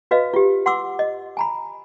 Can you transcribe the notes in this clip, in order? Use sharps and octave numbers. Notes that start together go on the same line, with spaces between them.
F#4 B4 D#5 F5
F4 G4
F#5 C6 D6 E6
D#5
G#5 A#5 B5